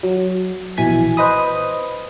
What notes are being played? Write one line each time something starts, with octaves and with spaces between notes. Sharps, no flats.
F#3
A#1 B2 E3 G#5 G#6 B6
B4 C5 D#5 B5 D#6